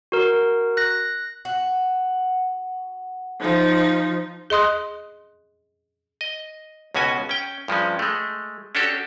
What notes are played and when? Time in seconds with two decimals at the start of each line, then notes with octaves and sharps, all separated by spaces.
0.12 F#4 A#4
0.77 F#6 A#6
1.45 F#4
3.40 F3 D#4
4.50 G#4 D#5 C6 D#6 F#6
6.21 D#5
6.95 C#2 B2 C#4 F#4 G#5
7.29 C#4 G5
7.68 G2 F3 G#3 C#4
7.99 G#3 A3
8.75 C#4 D4 F#4 G4 A4